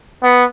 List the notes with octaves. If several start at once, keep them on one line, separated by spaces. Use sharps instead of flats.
B3